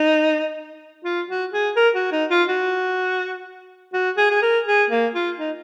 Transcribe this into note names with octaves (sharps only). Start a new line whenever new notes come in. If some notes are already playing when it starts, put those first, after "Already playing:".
Already playing: D#4
F4
F#4
G#4
A#4
F#4
D#4
F4
F#4
F#4
G#4
G#4
A#4
G#4
A#3
F4
D#4